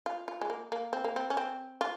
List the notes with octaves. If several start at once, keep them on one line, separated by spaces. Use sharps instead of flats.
F4
F4
G#3
A#3
A#3
C4
A#3
C4
C#4
C4
F4